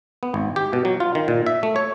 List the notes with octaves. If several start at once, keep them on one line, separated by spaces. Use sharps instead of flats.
B3
G#1
G4
B2
F#3
F4
D#3
A#2
E5
A3
C#5